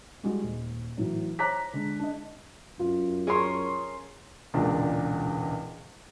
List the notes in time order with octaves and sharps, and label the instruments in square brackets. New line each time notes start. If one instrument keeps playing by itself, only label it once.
[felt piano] G3 G#3 F#4
D#1
A2 E3 F#3
C5 C#5 A#5 D6 F#6 B6
D3 G#3
D4 D#5
[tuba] F#2 [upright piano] F4
[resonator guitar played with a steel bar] C#4 A#4 C#5 [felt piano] G#4 C6
[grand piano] E1 C#2 A#2 D4